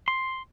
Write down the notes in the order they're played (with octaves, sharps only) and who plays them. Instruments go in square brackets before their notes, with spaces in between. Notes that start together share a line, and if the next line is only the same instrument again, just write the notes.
[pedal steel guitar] C6